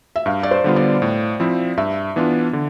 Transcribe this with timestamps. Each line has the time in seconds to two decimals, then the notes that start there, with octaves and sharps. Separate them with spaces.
0.16 E5
0.26 G2 F5
0.43 D5
0.51 C5
0.64 D3 G3 B3 F4
0.76 D5
1.02 A2
1.40 F3 C4 E4
1.77 G2 E5
2.16 E3 B3 D4 F4
2.53 D3